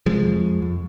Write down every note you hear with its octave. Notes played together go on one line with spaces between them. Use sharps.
C3 F3 G#3
F2
F2
F2